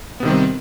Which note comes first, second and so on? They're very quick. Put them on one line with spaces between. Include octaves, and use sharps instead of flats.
B3 C3 D#3 G3 C4